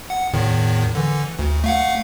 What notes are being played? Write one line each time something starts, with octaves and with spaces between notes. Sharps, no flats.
F#5
E2 A2 D#3
D3 E3
D2
A3 F5 F#5